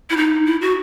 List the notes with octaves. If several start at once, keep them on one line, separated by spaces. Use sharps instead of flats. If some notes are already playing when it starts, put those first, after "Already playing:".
E4
D#4
E4
F#4